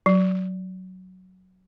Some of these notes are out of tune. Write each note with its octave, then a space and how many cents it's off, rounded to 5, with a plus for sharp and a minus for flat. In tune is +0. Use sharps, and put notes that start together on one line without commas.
F#3 +5